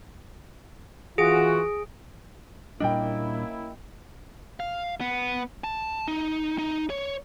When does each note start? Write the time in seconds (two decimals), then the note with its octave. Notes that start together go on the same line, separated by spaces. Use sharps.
1.18 E3 F4 F#4 G#4 D7
2.80 A#2 G3 A#3 C#4 D4 E4 D#5 G5
4.60 F5
5.01 B3
5.64 A5
6.08 D#4
6.58 D#4
6.90 C#5